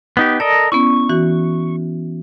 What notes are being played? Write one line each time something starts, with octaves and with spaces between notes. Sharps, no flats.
B3 D#4 G4
A4 A#4 D5 D#5
B3 C#4 E4 C#6
E3 F#4